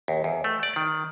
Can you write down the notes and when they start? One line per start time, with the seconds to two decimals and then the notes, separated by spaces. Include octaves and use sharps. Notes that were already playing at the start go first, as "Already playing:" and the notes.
0.08 D#2
0.24 E2
0.44 A3
0.63 D5
0.76 D#3